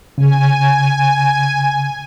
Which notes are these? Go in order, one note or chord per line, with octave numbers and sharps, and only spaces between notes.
C#3 G#5